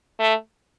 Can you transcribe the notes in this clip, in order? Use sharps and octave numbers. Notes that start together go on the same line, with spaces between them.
A3